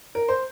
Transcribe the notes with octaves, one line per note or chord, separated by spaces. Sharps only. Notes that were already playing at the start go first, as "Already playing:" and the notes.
A#4
C5